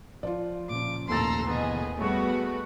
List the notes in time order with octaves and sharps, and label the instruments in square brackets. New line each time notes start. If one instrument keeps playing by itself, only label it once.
[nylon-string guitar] F3 [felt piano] F4 D5
[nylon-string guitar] A#2 C#3 F3 [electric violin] D6
[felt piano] G#1 D#2 A6 [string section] A2 A4 E6 [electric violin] A#5 C6
[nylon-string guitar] B2 D3 E3 [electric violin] B3 [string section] G#4 D#5
[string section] G3 B3 F#4 [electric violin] A3 [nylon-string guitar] G#4 C#5